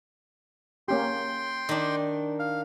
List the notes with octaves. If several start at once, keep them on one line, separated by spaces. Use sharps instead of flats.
A#3 C#4 G4 G5 C6
D#3 D4
F5